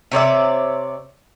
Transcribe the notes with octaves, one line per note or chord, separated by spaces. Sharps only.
C3 C#5 D5 E5